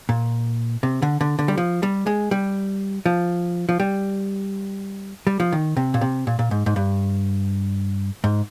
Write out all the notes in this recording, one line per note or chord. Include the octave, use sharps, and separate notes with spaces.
A#2
C3
D3
D3
D3
G3
F3
G3
G#3
G3
F3
F3
G3
G3
F3
D#3
C3
A#2
C3
A#2
A#2
G#2
G#2
G2
G#2